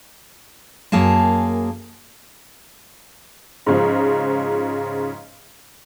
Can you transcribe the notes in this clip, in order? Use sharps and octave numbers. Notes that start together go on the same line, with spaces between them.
F#2 A#3 G#4 F5 A5
G#2 C#3 F3